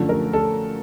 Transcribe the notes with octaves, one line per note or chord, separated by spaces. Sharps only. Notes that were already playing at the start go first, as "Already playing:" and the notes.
Already playing: F#2 D3 F3 A3
A#4
A4